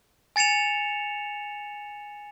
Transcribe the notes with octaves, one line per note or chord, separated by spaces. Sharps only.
G#5 A6 C#7 E7 F7